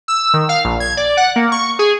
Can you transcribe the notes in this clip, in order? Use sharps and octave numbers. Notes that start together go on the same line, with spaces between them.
E6
D#3
F5
A#1
G#6
D5
F#5
A#3
C#6
G#4